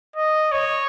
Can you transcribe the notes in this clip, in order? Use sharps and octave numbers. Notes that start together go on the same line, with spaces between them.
D#5
C#5